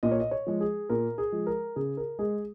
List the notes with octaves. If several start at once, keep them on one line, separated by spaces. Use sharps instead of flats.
A#2 D#5
C#5
D#5
C#5
F3 G#3
G#4
A#2 A#4
G#4
F3 G#3
A#4
C#3 G#4
A#4
G#3 G#4